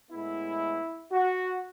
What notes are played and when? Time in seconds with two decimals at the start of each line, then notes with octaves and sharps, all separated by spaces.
0.10 A2 G#3 B3 E4
1.12 F#4